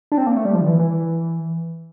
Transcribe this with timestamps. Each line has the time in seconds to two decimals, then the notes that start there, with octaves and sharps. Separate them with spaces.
0.12 D4
0.18 C4
0.27 A#3
0.36 A3
0.45 G3
0.55 F3
0.61 D3
0.67 E3
0.79 E3